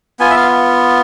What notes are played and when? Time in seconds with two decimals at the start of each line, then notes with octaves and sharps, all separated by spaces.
0.20 B3 F4 G#5
0.30 E5
0.37 F5